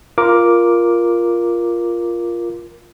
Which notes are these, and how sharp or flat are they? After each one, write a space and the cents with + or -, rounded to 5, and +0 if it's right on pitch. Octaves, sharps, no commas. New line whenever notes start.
F4 -10 A#4 +10 D6 +0